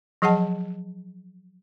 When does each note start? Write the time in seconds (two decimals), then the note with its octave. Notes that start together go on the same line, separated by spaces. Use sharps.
0.22 F3 F#3 G#4 D#5 F#5 A5